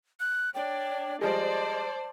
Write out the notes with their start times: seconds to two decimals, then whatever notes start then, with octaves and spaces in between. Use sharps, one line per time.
0.20 F#6
0.55 D4 C#5 D5 G5
1.21 F3 G3 G#3 C5 D5 D#5 A5